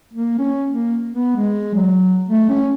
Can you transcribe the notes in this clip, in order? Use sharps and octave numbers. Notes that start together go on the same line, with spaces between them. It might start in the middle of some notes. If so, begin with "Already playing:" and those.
A#3
C#4
A#3
B3
G#3
F#3
A3
C#4